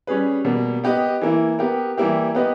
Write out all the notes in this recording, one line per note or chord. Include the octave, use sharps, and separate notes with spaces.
G3 C#4 G#4 B4
B2 G3 A#3
B3 G4 B4 D#5
E3 A#3 E4
B3 G4 A#4
E3 G3 A#3 E4 G4
B3 G4 B4 D#5